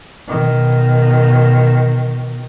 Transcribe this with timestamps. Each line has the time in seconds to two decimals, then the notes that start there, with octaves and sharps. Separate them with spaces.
0.28 B2 D#3